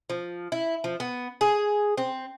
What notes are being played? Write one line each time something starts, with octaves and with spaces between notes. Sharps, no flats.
F3
E4
F3
B3
G#4
C4